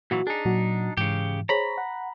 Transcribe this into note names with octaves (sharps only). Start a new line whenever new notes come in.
A#2 E3 F#3 F#4
D4 D#4 G#4
A#2 F#3 F#4
G#2 C#3 E3 G4
G#4 C5 C#5 A#5 B5
F#5